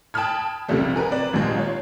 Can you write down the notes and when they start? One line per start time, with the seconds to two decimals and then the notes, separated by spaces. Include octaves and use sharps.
0.14 G5 A5 B5 D#6 F6 G#6
0.68 F1 C#2 C3 F3 G3 A3
0.96 G#4 A#4 B4
1.11 C4 B4 D5
1.33 G#1 D#2 A#2 G#3
1.57 F4 C#5